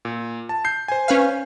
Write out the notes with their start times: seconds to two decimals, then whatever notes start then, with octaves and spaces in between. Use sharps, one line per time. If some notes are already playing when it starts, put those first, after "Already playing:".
0.05 A#2
0.49 A5
0.65 G6 C7
0.88 C5 G#5
1.08 C#4 B4 F5